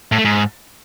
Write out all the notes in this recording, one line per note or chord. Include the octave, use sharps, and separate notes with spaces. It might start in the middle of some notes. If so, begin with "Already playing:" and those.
A2
A3
G#2